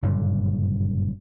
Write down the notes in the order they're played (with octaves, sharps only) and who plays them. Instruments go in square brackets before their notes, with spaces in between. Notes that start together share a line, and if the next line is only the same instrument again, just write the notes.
[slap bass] F#1 G2 A#2 D3